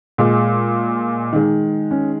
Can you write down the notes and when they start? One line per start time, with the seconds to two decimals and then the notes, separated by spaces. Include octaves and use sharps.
0.18 A#2 G#3
1.33 D#3 G#3
1.91 C#4